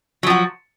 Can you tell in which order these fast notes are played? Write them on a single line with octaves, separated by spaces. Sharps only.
F#3 F3 F#4